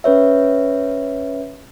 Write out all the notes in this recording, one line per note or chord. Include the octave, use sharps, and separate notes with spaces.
C#4 B4 C#5 E5